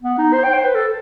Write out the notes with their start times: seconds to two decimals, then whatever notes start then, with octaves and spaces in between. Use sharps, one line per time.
0.02 B3
0.18 D#4
0.33 C5
0.44 G5
0.54 C5
0.64 B4
0.75 A4